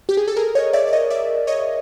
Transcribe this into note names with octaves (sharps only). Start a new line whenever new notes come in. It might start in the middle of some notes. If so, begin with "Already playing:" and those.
G4
G#4
A4
G#4 A#4
C#5 D#5
D5 E5
D5
C#5 D#5
D5 E5
C#5 D#5